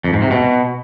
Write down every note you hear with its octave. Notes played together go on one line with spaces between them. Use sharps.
F2
G#2
C3
B2